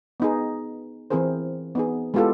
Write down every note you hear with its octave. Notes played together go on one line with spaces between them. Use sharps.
B3 D#4 G#4
E3 C4 E4 G#4 A#4 C5
B3 D#4 G#4
G#3 B3 E4 F4 G4 A4